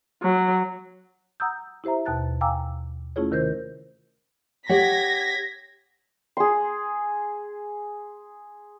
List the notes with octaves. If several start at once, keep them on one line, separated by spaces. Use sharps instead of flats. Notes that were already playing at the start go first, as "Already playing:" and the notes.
F#3
F#5 A#5 D#6 E6 G6
E4 G4 C5 E5 A#5
D#2 B2 A5 F#6 A6
F5 G5 G#5 A#5 D6 E6
A3 C#4 E4 F4 G#4 C#5
C3 D#3 A#4 C5 G6
G4 C#5 F#5 G#6 A#6 B6
G#4 C6